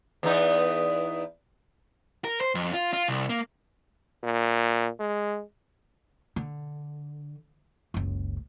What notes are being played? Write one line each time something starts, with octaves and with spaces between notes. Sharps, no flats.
E2 B3 D#4
A#4
C5
F2
F4
F4
C2
A#3
A#2
G#3
D3
F#1 C#2